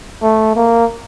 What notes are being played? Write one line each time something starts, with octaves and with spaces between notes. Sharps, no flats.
A3
A#3